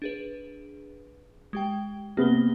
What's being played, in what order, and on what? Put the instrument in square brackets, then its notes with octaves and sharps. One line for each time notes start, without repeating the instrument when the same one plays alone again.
[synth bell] D4 G#4 B4
G#3 G4 G5
[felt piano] C3 B3 [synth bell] A#3 G7